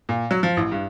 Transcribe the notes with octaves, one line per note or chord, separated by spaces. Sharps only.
A#2
F#3
F3
A1
G2